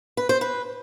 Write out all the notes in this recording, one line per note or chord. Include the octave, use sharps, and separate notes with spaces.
B4
C5
B4